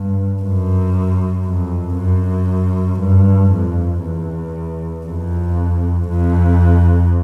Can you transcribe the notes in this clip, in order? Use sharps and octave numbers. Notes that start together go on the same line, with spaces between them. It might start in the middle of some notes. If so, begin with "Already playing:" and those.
Already playing: G2
F#2
F2
F#2
G2
F2
E2
F2
F2